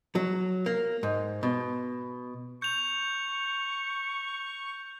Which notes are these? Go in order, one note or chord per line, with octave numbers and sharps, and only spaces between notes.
F#3
A#3
G#2
B2
C#6 G6 F7